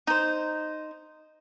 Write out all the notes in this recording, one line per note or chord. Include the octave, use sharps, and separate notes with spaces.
D#4 C5